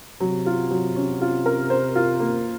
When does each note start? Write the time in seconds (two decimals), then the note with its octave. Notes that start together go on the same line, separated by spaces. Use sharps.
0.20 C3 F#3
0.46 F4
0.71 F#3
0.96 C#4
1.21 F4
1.46 A#4
1.70 C5
1.95 F4
2.20 A#3